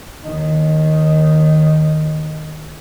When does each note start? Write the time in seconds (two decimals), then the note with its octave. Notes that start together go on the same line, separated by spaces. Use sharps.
0.24 D#2 D#3